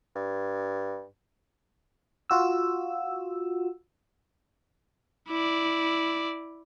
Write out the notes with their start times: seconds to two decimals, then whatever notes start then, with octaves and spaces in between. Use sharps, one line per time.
0.16 G2
2.30 F4 F#4 E6
5.28 E4 D5